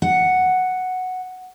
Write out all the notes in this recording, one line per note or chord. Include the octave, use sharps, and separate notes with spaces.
F#5